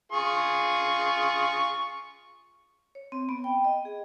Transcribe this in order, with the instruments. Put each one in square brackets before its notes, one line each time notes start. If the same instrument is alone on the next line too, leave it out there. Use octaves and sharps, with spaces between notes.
[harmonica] F4 G#4 C#6
[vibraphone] C#5
C4
B3
G5
D#5
G#4